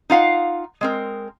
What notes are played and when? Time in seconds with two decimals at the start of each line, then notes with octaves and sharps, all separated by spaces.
0.10 D#4 F4 F5 F#5
0.81 G#3 C4 A#4